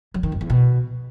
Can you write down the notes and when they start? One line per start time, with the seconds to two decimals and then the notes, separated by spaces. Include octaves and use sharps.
0.14 F#3
0.23 D#3
0.32 F2
0.41 E2
0.50 B2